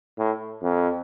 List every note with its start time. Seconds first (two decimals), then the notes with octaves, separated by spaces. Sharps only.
0.18 A2
0.62 F2